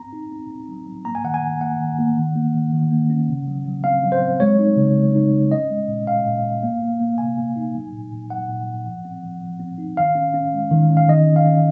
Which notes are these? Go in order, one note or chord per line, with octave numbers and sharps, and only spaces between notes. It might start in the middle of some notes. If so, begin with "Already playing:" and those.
Already playing: C4 A#5
D#4
C4
C4
F#3
F#3
A#3 A#5
G#5
D#3 F#5
G#5
D#3
A#3 F#5
D#3
A#3
D#3
A#3
D#3
D#3
A#3
C#4
C#3
F#3
F#3
C4 F5
F#3
C5
C4
G#3 C#5
D#4
C#3
G#3
D#4
C#3
C#4 D#5
G#3
A#2
A#2 F5
A#2
A#2
A#3
A#3
A#3
C3 G#5
A#3
D#4
F#3
A#2
A#2
F#3 F#5
A#2
A#2
F3
C4
F3
F3
C4
D#4
D#3 F5
C#4
C#4
G#3
D#3
C#4
F5
D#3 D#5
C#4
F5
C#4